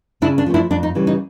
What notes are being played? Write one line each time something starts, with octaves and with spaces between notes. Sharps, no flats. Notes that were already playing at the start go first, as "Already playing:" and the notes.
C#3 D4 E4
D4
F3 A3 C#4
D4 E4
F2 D4
D#4
C#3 E3 G3
D#4